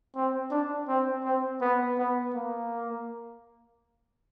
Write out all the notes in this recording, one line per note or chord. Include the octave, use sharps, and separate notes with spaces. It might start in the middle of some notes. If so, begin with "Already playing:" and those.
C4
D4
C4
C4
B3
B3
A#3